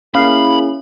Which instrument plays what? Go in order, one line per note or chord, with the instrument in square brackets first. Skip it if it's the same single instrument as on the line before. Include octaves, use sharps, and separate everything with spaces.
[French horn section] A#3 E4 G#4 [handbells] C#4 [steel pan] F5 [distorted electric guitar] B5